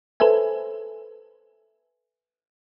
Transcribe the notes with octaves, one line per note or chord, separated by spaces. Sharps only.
A4 B4 C5 E5 G#5